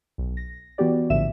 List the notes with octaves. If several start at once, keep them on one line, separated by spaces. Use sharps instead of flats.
B1
A#6
E3 B3 F#4 G4 D5
A#1 A2 D3 F3 E5 E7